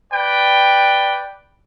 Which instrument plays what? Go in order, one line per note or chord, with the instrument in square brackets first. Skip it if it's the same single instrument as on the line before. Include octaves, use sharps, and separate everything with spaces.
[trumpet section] B4 D5 G5